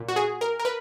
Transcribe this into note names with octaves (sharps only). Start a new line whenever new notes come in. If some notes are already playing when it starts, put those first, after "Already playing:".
Already playing: A#2
F#4
G#4
A#4
A#4
B4